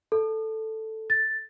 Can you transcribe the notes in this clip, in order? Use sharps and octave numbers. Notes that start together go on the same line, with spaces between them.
A4
A6